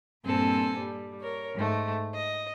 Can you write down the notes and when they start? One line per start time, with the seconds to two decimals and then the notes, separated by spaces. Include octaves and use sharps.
0.25 G2 A#2 C4 A4 G#5
0.78 G3
1.19 A#4 C#5
1.54 G#2 A3
2.14 D#5